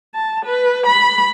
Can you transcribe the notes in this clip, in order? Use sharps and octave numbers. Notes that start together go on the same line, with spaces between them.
A5
B4
B5